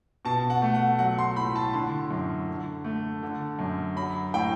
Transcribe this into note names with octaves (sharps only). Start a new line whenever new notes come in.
B2 A5
F#5
A3
F#5
F#3 F#5
C6
A2 B5
A5
D3 C6
F#2
D3
A3
D3
F#2
F#3 B5
A2 G5